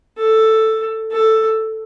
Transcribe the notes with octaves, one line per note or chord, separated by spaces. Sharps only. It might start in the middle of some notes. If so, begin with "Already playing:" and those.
A4
A4